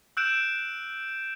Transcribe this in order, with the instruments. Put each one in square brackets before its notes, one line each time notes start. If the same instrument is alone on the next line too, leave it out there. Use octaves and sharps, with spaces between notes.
[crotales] E6 F#6 G6 D7 E7